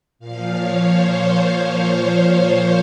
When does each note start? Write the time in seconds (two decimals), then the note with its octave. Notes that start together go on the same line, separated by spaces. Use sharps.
0.19 A#2 F3 F5
0.54 C#5
0.88 C5